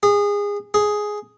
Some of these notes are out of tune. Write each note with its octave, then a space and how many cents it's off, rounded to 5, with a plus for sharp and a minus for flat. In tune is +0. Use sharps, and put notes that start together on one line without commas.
G#4 -25
G#4 +5